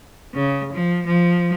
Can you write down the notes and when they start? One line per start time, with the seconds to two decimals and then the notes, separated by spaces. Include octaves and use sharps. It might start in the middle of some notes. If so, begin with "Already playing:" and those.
0.34 C#3
0.73 F3
1.06 F3